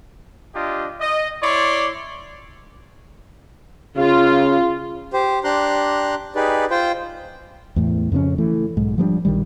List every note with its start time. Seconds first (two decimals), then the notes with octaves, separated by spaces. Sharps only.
0.55 D4 F4 G4 D#5
1.01 D#5
1.43 E4 C#5 D5 C6
3.97 C#3 F4
5.13 G4 C5
5.44 D4 G4 A#5 C6 F#6
6.36 D#4 G4 G#4 B4 D5
6.71 F4 C5 G5
7.76 E2 A2
8.12 F2 C#3 A#3 C#4
8.38 E3 A3
8.77 B1 G#2
8.98 F3 G3 A3 D4
9.25 A#1 D#3 G3